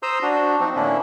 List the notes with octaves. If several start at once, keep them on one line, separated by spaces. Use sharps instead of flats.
C5 A#5 C6 D#6 E6 G6
D4 F#4
F3 C4 D#4
A2 D3 A#3 C#4 D4 E4